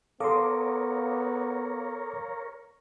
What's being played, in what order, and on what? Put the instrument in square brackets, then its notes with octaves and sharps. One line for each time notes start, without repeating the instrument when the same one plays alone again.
[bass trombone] B3 [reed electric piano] A4 C6 [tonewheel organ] A#4 C#5 [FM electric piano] F5 D6 D#6